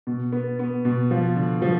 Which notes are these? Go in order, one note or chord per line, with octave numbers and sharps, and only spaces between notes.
B2
B3
B3
B2
F3
D3
F3